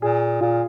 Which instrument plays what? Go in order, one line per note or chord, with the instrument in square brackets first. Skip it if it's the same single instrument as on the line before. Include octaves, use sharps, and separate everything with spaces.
[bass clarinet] A#2 [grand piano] G#4
[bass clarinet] A#2 [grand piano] F4